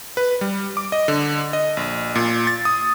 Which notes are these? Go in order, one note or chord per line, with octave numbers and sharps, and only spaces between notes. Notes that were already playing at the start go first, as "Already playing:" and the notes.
B4
G3
D6
D#5
D3
D#5
A#1
A#2
A6
D#6